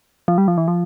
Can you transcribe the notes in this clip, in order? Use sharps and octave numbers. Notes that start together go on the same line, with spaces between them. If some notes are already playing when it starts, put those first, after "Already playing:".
F3
G3
F3
E3
F3